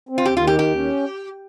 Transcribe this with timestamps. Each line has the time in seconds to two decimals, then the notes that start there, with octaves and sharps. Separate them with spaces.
0.09 C4
0.18 F4
0.26 D#2 G4
0.37 F4
0.43 D#3 G4
0.59 D#2 G4
0.75 C#4